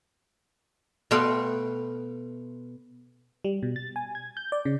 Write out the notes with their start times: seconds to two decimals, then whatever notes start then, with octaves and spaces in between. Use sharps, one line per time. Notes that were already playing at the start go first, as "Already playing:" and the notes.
1.11 B2 A3 B3 F5 G5 C6
3.44 G3
3.63 B2
3.76 A6
3.96 G#5
4.15 G#6
4.37 G6
4.52 D5
4.65 C#3